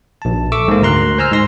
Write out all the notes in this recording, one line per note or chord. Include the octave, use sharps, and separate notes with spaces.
A#1 A5
A4 E5 C#6 D6 E6
G#2 A#3
D2 A#4 A#5 C6 F#6
C5 G#5 A#5 E6 F6
G#2 D#4 C6 A#6